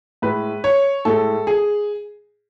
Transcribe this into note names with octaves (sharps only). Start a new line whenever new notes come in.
A2 G#3 B4
C#5
A2 G#3 A4
G#4